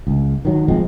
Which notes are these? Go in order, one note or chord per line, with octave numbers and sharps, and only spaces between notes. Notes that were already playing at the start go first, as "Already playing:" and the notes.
C#2
D#3 F#3
F1 F3 G#3 C4